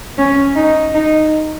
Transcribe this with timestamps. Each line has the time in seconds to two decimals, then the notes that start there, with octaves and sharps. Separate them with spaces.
0.18 C#4
0.56 D#4
0.94 D#4